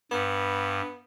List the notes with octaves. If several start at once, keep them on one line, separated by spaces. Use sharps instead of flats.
G2 B3